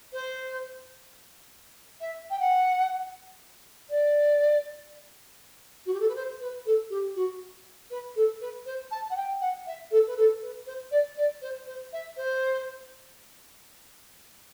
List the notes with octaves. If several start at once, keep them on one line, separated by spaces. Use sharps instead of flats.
C5
E5
G5
F#5
D5
F#4
G4
A4
B4
C5
B4
A4
G4
F#4
B4
A4
B4
C5
A5
F#5
G5
F#5
E5
A4
B4
A4
B4
C5
D5
D5
C5
C5
E5
C5